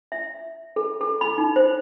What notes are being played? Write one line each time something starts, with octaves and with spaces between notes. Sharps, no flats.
E5
A4
A4
B5
D#4
C5